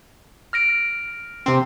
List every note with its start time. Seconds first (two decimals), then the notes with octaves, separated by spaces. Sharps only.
0.53 F6 A#6 D7
1.46 C3 C4